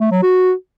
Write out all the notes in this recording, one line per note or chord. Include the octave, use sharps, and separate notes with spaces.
A3
F#3
F#4